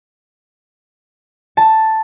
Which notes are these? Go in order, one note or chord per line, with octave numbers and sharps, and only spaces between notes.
A5